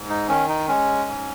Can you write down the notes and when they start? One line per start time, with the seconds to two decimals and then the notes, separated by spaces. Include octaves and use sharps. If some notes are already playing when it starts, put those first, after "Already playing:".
Already playing: G#2
0.10 D#4
0.28 D#3 C#4
0.49 D#4
0.68 G#3 C#4
1.07 G#2